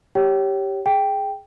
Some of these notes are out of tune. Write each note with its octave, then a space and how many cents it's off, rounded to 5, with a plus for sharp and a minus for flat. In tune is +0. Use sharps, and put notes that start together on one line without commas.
G4 +0 C#5 +0 G5 -30
G#4 +5 G5 +0